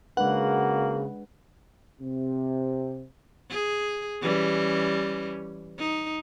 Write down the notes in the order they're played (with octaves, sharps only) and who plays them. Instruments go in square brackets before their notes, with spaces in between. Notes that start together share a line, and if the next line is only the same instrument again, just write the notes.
[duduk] C#3 [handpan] G#3 D4 B4 [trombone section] A#3 F#4 A#4 [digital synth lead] F#5
[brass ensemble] C3
[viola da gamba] G#4
E3 G3 C#4
D#4